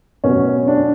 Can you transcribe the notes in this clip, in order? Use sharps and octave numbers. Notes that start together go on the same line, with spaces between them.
B2 F#3 B3 C#4
D4